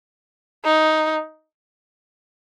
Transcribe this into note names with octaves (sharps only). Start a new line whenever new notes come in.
D#4